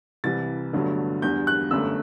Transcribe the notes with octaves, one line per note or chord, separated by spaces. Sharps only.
C2 C3 E3 G3 A6
G1 G2 D3 F#3 A3
E2 D3 G3 G6
F#6
G1 F#2 D3 A3 E6